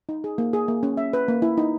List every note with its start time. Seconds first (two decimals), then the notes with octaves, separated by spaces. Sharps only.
0.09 D#4
0.24 G#4
0.38 A#3
0.53 G#4
0.68 A#3
0.83 C#4
0.97 E5
1.13 B4
1.28 A#3
1.42 E4
1.58 D#4